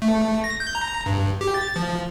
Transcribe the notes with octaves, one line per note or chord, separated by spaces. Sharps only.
A3
A#6
G6
A#5
G2
G4
A6
F3